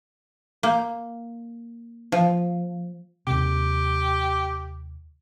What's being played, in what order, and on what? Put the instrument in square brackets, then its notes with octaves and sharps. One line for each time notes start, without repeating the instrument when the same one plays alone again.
[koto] A#3
F3
[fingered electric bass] D#2 C3 [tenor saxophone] G4